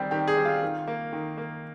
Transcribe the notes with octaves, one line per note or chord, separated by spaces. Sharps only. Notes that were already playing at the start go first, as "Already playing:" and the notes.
Already playing: D#3 G3 C4 G4
D#3 G4
G#4
G3 C4
F4
D#3
A#3
D#3
A#3